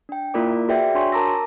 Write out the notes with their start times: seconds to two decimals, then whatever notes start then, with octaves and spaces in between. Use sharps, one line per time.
0.09 D4 G5
0.34 A#3 E4 F4 A#4 D5 D6
0.69 F#4 G#4 B4 D5 E5 G5
0.95 D4 F#4 C#5 G#5 C6 C#6
1.12 A#4 A5 A#5 D6 E6 A#6